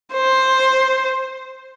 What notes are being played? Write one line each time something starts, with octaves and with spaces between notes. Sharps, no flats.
C5